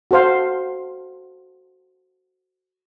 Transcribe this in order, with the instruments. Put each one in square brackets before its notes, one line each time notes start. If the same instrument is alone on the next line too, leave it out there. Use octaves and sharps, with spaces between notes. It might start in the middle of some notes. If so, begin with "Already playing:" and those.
[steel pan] F#4 A4 C5 F5